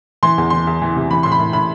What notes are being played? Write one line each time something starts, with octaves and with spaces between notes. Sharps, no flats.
E3 C6
E2
E3 C6
E2
E3
C3
E3 B5
A2 C6
B5
A2
A2 B5